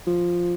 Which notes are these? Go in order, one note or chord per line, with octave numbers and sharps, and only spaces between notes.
F3